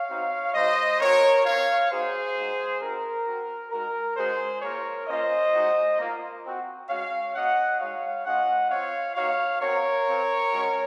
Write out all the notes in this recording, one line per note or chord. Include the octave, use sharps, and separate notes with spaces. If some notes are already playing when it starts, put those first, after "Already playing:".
Already playing: C#5 F5
C4 D#4 F#4
G#3 D#4 F#4 C5 D#5
C4 D#4 F#4 A#4 C#5
C4 F4 C#5 F5
A#3 D#4 F#4 G#4 C5
G#3 D#4 F#4
C4 D#4 F#4 A#4
C4 F#4
G#3 D#4 F#4 A#4
G#3 C#4 F#4 G#4 C5
A#3 F4 A#4 C#5
A#3 C#4 F4 C5 D#5
G#3 D#4 F#4
A#3 F4
C4 F#4
G#3 C#4 F#4 C#5 F5
A#3 C#4 F#4 D#5 F#5
G#3 D#4 F#4 C#5 F5
G#3 C#4 F4 D#5 F#5
C4 F4 C#5 F5
A#3 D#4 F#4 C#5 F5
C4 F#4 A#4 C#5
C4 F4
G#3 C#4 F#4